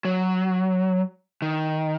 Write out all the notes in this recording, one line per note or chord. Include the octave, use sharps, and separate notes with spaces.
F#3
D#3